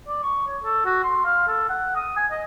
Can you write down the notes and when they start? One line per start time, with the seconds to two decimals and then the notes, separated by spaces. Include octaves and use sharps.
0.08 D5
0.23 C#6
0.47 C#5
0.64 A4
0.85 F#4
1.04 C6
1.25 F5
1.48 A4
1.70 F#5
1.96 D#6
2.17 G#5
2.31 D#5